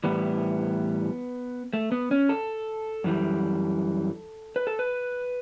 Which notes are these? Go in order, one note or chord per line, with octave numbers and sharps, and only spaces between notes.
A2 E3 G3 B3
A3
B3
C#4
A4
F#2 E3 G3
B4
A4
B4